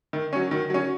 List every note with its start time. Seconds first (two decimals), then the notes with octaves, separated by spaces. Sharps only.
0.13 D#3
0.33 F#3 C#4
0.51 D#3
0.70 F#3 C#4